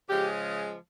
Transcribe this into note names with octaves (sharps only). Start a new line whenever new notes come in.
C#3 F3 G#3 G4